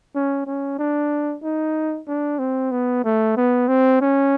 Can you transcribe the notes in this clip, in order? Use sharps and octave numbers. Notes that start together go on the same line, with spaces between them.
C#4
C#4
D4
D#4
D4
C4
B3
A3
B3
C4
C#4